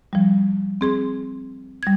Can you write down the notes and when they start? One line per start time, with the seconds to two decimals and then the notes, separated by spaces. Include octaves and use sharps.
0.13 F3 G3
0.81 C4 G#4 C6
1.83 G3 G#6